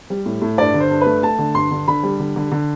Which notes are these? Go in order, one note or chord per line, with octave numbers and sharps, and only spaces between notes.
G3
A2
A2
G2 D5
D3
C5
G2
A3 B4
A3 A5
D3
G2 C6
D3
D3 B5
G3
D3
D3
D3